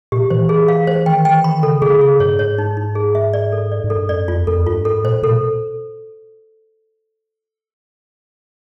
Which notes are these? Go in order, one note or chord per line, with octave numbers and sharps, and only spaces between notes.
A#2 G4
E3 C5
G#4
F5
C5
D#3 G5
E3 G5
D#3 B5
C#3 A4
D3 G#4
C#3 G#4
G2 C#5
G#2 C#5
D#4
D#4
G#4
E5
D5
A4
D5
G#2
A4
G2
F#2 D5
F2 F4
F2 A4
G2 F4
G#2 A4
A#2 C5
B2 A4